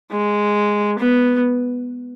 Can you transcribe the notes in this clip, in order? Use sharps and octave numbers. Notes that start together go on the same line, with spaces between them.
G#3
B3